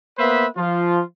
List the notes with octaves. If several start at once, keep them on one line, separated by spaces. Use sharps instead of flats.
A#3 B3 B4 C5 E5
F3 F4